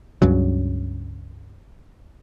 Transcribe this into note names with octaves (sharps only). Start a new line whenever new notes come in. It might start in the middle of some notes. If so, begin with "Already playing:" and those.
C#2 G2 C#3 F#3